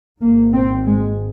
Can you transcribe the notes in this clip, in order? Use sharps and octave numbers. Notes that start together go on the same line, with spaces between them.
G#1 G#2 A#3
C4
G#3